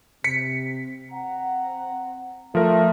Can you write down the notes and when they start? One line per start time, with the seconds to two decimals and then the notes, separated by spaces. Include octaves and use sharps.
0.24 C3 B6 C#7
1.12 C4 F#5 A#5
2.55 F3 A3 A#4